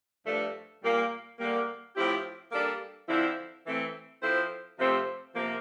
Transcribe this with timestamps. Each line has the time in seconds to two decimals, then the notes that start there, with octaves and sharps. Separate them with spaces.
0.25 G2 F3 A3 D4 A4
0.82 A#2 G3 A#3
1.39 D3 G3 A#3
1.95 A2 F3 C4 E4 G4
2.52 G3 A#3 D4 A4
3.08 D3 F3 C4 E4
3.64 E3 A3 C4
4.21 F3 C4 E4 A4 C5
4.78 C3 F3 A3 C4 G4
5.34 C3 F3 A#3